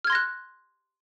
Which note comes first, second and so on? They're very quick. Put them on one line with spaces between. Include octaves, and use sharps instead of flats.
F6 G#6 C6 A#6 F#6